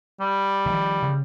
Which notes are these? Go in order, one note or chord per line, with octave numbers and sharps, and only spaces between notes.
G3
D#3 F3
C#3